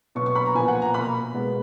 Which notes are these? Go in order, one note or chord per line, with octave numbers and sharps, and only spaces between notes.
B2 F#3 B3 C#6
C#6
B5
A#5
A#2 F3 B3 G#5
F#5
A#5
B2 A#3 B5
B2 G#3 B3